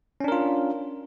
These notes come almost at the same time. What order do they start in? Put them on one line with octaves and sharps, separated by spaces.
C#4 D4 A#4 F4